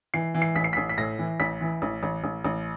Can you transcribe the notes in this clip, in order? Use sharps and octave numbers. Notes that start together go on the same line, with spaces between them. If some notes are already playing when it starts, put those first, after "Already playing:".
E3 C7
E3
C7
A1 B6
C7
A1 B6
B6
A2 A#6
E3
A1 B6
E3
A1
A1
A1
A1